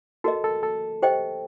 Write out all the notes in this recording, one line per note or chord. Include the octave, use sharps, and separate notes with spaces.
F#4 A4 A#4 D#5
A4
A4
G4 C5 D#5 G5